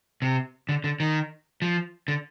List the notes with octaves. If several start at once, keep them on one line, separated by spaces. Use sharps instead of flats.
C3
D3
D3
D#3
F3
D3